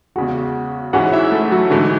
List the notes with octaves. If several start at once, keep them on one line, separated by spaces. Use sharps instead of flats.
E2 C#3 G#3 F#4 F#5
G#2 E3 G#3 C#4 F#4 F#5
E4 E5
A3 A4
F#3 F#4
G#2 D3 E3 A3 D4